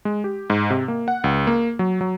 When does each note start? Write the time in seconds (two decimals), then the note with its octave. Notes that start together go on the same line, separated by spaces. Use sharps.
0.05 G#3
0.24 G4
0.50 G#2
0.70 C3
0.88 A#3
1.08 F#5
1.24 C#2
1.47 A#3
1.79 F#3
2.01 F#3